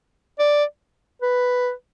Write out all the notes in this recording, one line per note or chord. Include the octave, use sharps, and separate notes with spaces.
D5
B4